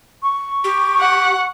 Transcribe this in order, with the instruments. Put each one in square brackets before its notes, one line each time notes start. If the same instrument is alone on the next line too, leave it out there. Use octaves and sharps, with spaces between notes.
[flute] C#6
[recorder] G4
[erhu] F#5